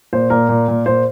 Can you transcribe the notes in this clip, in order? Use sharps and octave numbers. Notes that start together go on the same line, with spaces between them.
A#2 C5
A#2 A#4
A#2
A#2
A#2 C5